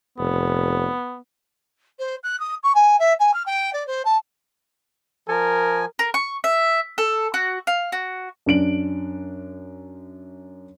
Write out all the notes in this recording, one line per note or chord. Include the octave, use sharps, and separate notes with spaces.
F1 B3
C5
F#6
D#6
C#6
G#5
E5
G#5
F6
G5
D5
C5
A5
F3 A#4 G#5
A#4
C#6
E5
A4
F#4
F5
F#4
F#2 D4 D7 F#7